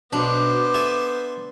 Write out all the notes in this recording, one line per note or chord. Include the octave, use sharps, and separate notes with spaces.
B1 B2 B3 D4 C5 D6
A4 E5 G#5